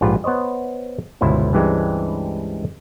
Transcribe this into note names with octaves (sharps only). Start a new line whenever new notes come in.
A#1 G#2 F4 G4 B4
B3 C5 C#5 D#5
G1 C#2 B2 E4 C5
C#2 G2 E3 G3 G#3 C4